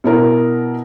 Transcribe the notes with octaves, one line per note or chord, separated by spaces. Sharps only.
B2 E4 A#4